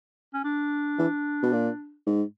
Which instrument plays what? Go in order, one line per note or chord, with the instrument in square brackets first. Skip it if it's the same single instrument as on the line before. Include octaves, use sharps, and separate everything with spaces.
[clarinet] C#4
D4
[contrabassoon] E3
B2
A#2
G#2